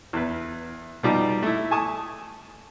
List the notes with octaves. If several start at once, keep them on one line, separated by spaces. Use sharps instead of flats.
E2 B4
B2 F3 G3 D#4 G4
A3 E4
G#5 A5 C#6 D#6